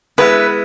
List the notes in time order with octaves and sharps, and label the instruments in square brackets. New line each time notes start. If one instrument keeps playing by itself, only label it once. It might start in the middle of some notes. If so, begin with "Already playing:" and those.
[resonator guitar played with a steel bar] G#3 B3 E4 [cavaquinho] B4